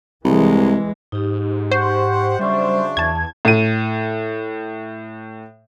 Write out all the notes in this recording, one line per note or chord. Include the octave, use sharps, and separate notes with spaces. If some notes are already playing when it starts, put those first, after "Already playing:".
C2 E3 G#3
G#2 D#4 G4
G4 C5 F#5 C#6
C#3 F#3 G3 D4 E5 C#6
E2 A5 G#6
A2 D#7